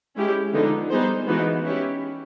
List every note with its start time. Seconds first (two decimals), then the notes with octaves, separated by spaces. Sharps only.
0.16 G#3 C#4 E4 G4
0.53 D3 F3 G#3 B3 D#4
0.90 G3 B3 D#4 G#4 C5
1.27 E3 G#3 B3 D#4 F#4
1.65 C#4 E4 G4